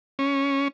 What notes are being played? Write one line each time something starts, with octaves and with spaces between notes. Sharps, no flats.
C#4